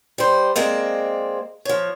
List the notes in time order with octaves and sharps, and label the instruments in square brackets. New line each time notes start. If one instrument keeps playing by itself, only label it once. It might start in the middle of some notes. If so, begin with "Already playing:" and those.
[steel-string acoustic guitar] G3 C5
G#3 A#3 C4 D5
F3 C#5